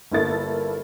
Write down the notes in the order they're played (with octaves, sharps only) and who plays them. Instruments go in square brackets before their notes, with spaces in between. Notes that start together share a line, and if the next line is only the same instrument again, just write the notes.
[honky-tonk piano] G1 A#3 E4 A4 A6